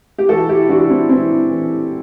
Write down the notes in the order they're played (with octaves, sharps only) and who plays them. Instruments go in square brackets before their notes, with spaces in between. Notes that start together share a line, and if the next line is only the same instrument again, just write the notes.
[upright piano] G4
E3 F#4 A4
E4 G4
E3 D4 F#4
C4 E4
E3 C4 E4
E3